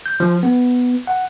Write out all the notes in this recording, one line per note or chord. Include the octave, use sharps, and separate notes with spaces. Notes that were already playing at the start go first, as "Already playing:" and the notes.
G6
F3
B3
F#5